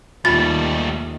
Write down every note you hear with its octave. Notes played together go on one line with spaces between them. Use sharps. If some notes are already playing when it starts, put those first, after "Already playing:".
D#2 D#3 G3 A3 F4 B5 A6